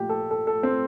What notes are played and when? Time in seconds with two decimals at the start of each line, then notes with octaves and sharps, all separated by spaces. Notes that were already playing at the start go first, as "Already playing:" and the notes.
Already playing: A#2 F3 A3 G4
0.09 A4
0.31 A4
0.47 A4
0.63 C4 C5